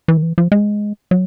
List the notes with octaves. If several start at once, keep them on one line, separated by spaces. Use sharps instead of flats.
E3
D#3
E3
F3
G#3
F#3